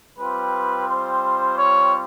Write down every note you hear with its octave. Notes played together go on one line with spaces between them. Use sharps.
G3 C4 F4 B4
C5
C#5